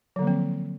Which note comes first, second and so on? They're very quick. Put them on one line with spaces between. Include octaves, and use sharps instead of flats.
F#3 D3 A#3 F3 C4